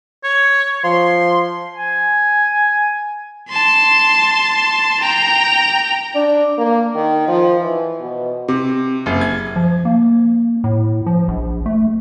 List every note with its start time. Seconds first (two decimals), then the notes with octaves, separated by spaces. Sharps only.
0.24 C#5
0.84 F3 C6
1.77 G#5
3.49 A5 C6
5.00 G5 A#5
6.15 D4
6.58 A#3
6.95 D#3
7.28 F3
7.60 E3
8.01 B2
8.48 C3
9.06 F#1
9.21 G#6
9.56 F3
9.85 A#3
10.64 A2
11.06 F3
11.28 A#1
11.66 A3